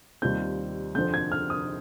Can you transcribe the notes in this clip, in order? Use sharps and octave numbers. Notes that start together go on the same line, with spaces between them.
D#2 D#3 G3 C4 F4 G6
F2 D3 F3 C4 G6
G#6
F6
D#6